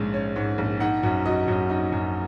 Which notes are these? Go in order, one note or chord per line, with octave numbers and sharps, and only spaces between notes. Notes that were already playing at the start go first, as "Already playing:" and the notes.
Already playing: A#1 G#2 G#3 C#4
C#4
G#2
A#1
D#4 F#5
F#2
F#3 D#5
F#2
D#4
F#2